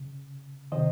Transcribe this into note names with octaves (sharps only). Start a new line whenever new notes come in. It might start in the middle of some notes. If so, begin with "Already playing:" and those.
Already playing: C#3
C3 D#3 C5 D#5